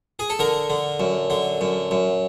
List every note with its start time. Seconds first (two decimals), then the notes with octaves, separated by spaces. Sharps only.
0.19 G#4
0.30 A4
0.39 D3 A#4
0.70 D3
1.00 F#2
1.30 D3
1.61 F#2
1.91 F#2